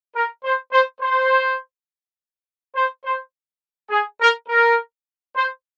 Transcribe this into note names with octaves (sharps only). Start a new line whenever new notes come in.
A#4
C5
C5
C5
C5
C5
G#4
A#4
A#4
C5